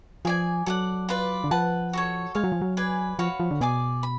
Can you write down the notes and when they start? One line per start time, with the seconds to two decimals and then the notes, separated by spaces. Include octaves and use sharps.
0.25 F3 G#4 D5 G#5
0.66 F#3 A4 D5 F#5
1.09 F4 B4 D5
1.44 D3
1.51 F3 B4 F#5 A5
1.93 F#4 A4 C#5
2.35 G#3 C#5 F5 G#5
2.44 F#3
2.52 F3
2.62 F#3
2.77 G#4 B4 D5 G#5
3.19 F3 F#4 C#5 F5 B5
3.40 F3
3.51 D3
3.61 B2 G#4 D5 G#5 D6
4.03 B5